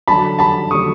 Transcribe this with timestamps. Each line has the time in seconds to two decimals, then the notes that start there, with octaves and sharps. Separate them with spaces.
0.08 D3 F#3 A5 B5
0.39 A5 B5
0.71 D3 F#3 C#6 D#6